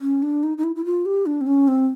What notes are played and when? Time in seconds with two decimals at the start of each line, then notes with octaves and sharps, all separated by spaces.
0.01 C#4
0.22 D4
0.43 D#4
0.58 D#4
0.64 E4
0.76 E4
0.85 F4
1.06 G4
1.26 D4
1.41 C4
1.47 C#4
1.68 C4